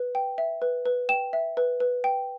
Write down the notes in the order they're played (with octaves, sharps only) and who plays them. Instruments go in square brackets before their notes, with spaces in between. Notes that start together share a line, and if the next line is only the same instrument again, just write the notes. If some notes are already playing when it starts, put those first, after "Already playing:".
Already playing: [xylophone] B4
G5
E5
B4
B4
G5 E7
E5
B4
B4
G5